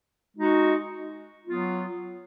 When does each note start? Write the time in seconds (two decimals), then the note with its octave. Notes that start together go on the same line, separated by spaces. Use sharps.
0.36 G#3 D#4 F#4
1.46 F#3 B3 F4